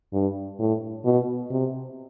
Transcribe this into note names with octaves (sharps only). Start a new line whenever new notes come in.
G2
A2
B2
C3